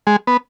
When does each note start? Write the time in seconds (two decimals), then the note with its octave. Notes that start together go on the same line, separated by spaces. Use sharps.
0.07 G#3
0.27 B3